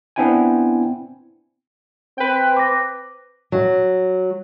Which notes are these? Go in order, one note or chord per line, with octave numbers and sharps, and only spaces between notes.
B3 C4 D4 E4 G5 G#5
C4 B4 G5
D6 A#6
F#3